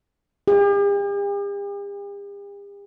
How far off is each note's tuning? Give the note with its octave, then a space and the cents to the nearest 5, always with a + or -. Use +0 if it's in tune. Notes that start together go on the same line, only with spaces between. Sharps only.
G4 +45